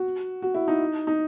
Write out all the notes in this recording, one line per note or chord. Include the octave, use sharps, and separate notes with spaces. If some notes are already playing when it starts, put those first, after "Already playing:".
Already playing: F#4
F#4
E4
D#4
D#4